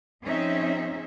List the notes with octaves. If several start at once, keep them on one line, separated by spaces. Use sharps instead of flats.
F3 C4 C#4 D#4 G#4 E5